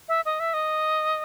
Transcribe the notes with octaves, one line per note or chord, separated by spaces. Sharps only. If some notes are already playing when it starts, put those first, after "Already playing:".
E5
D#5
E5
D#5